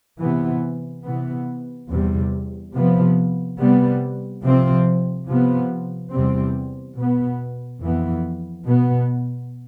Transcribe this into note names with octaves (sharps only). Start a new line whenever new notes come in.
C3 E3 B3
C3 E3 B3
E2 C3 G3
C3 F3 B3
C3 G3 B3
C3 F3 C4
C3 F3 B3
E2 C3 G3 C4
B2 B3
F2 E3 B3
B2 B3